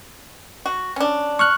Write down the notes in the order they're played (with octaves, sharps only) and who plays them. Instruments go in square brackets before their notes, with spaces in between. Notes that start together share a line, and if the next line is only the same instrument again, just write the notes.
[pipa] F#4
C#4 D4
[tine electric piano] C#6 F6 F#6